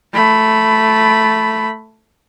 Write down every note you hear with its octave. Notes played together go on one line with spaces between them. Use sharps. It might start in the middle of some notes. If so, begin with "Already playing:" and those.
A3 B5